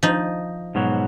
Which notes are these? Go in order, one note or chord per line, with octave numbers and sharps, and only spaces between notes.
F3 D#4
G#2 B2 F#3